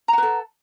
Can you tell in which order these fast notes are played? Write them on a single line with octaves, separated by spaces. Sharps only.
A#5 F#5 B4 A4